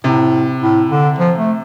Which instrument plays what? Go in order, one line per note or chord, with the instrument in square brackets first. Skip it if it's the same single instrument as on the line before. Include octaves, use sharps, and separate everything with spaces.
[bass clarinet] A2 [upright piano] C3
[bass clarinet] A2
D3
F3
A3